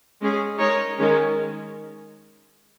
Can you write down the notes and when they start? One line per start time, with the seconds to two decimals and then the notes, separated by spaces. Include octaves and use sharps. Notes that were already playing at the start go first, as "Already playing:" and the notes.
0.21 G#3 C#4 G#4
0.59 G#3 D#4 A#4 C#5
0.99 D#3 G#3 C#4